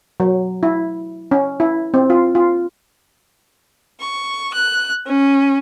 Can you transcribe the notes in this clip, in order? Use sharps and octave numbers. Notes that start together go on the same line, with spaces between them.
F#3
E4
C#4
E4
C4
F4
F4
C#6
F#6
C#4